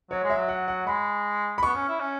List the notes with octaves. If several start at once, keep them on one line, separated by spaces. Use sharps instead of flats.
F#3 C#5
G#3
E5
F#3
F#5
F#5
G#3 B5
B5
B3 C#6
C#4
E4
C#4